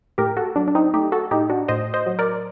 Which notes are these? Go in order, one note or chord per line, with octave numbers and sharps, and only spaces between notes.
A2 G4 A#4
F#4 A4
F#3 D4
D4
C4 D#4
A3 D#4 G4
F#4 A4
A2 D#4 G4
D4 F#4
A2 C5 D#5
C5 D#5
F#3
A#4 D5